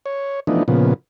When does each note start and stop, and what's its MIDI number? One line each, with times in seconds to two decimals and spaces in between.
0.06 0.40 73
0.47 0.63 52
0.47 0.63 53
0.47 0.63 57
0.47 0.63 59
0.47 0.63 62
0.47 0.63 63
0.68 0.94 46
0.68 0.94 49
0.68 0.94 53
0.68 0.94 59